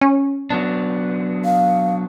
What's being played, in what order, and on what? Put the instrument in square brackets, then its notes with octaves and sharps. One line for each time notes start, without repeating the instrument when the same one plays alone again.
[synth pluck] C#4
[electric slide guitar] F#3 B3 D4
[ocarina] F5